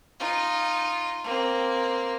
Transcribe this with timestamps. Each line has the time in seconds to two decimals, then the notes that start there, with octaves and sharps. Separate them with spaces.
0.19 D#4 F4
1.24 A#3 C4